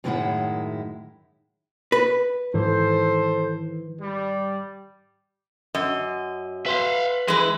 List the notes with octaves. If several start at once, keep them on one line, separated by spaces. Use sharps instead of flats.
F#2 A2 D#3 G#3 E4 F#5
B4
G#2 D#3 E3 A4 C5
G3
F#2 D#5
B4 E5 F5 C6
E3 G#3 E4 B4